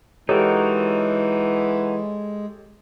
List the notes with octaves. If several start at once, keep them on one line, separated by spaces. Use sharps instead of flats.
E3 G#3 D#4 F#4 G4 A4 A#4 C#5